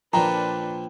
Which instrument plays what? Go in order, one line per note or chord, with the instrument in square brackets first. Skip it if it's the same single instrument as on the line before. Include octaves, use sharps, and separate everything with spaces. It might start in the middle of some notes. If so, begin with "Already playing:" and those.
[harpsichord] A#2 F3 [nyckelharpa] D4 B4 [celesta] G5 [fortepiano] A#5